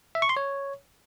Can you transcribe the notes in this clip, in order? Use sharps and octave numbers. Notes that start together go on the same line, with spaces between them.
E5
C#6
C6
C#5